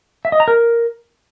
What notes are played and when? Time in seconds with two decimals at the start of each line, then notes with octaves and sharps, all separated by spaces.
0.25 E5
0.32 D#5
0.40 A#5
0.48 A#4